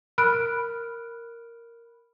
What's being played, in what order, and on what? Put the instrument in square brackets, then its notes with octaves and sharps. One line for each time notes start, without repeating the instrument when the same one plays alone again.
[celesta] A#4 B5 F6 F#6 D7